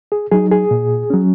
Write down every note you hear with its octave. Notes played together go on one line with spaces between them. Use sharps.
G#4
F#3 D#4 G#4
G#4
A#2
F#3 C#4